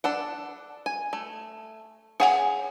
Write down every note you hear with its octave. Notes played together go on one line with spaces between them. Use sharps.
D4 A4 F#5
G#5
A3
G#4 C#5 F5 F#5 G#5